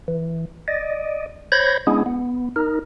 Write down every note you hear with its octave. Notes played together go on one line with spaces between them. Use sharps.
E3
D5 D#5
C5 C#5 B5 G6 G#6 A#6
G#3 B3 C#4 D4 E4 G#4
B3
D#4 A#4